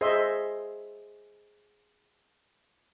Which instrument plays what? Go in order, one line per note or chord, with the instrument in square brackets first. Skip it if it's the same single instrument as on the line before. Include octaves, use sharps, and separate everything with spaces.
[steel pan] G#4 C5 D#5 E5 C6